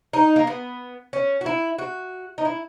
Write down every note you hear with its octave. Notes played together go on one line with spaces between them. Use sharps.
D#4
A#3
B3
C#4
F#4
E4
F#4
D#4
E4